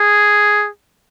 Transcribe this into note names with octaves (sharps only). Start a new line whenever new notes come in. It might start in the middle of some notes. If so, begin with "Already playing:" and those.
Already playing: G#4